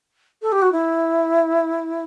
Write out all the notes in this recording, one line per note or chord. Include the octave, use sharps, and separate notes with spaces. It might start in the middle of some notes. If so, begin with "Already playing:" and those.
A4
G4
F#4
E4